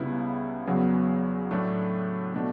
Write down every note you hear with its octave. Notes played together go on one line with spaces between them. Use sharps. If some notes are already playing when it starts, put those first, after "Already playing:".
Already playing: C#2 C#3 G3 B3 E4
E2 C#3 F#3 B3
A2 F#3 A3 D4
B2 A3 D4